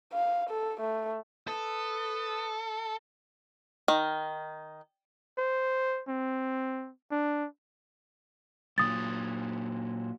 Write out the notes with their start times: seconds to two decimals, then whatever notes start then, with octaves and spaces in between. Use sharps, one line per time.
0.13 F5
0.50 A4
0.81 A3
1.48 A4 B4 D#6
3.88 D#3
5.38 C5
6.08 C4
7.11 D4
8.78 A#2 F#3 D#6 A6